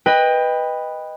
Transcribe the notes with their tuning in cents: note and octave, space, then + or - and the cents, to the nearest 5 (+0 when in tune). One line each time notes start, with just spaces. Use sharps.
B4 +0 D#5 +0 G5 +20